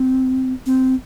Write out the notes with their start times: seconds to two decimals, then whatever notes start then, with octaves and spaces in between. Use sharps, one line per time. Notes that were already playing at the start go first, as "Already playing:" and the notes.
Already playing: C4
0.66 C4